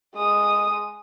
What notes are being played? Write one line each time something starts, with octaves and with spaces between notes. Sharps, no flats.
G#3 D#6